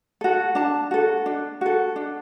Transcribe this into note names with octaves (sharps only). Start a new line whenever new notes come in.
F#4 A4
D4 A5
F#4 A4
D4
F#4 A4
D4